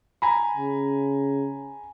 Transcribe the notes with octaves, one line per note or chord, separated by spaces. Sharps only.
G#5 A#5 B5
C#3